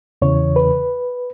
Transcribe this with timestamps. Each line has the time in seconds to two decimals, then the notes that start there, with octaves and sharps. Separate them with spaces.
0.22 E2 C#3 E3 C#5
0.56 B4